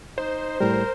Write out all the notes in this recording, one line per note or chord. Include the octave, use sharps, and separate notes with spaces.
D#4 C5
A2 G3 A#4